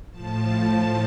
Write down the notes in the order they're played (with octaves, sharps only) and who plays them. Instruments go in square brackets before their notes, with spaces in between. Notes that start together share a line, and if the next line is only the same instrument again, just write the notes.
[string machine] A2 F3 A5